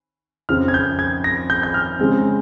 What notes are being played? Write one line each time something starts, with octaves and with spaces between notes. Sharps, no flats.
F2 C#3 F3 C4 F6
G#6
G6
G#6
A#6
G6
G6
F6
C#3 G#3 C4